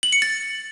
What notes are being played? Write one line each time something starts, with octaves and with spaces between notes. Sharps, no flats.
F#7
C#7
A6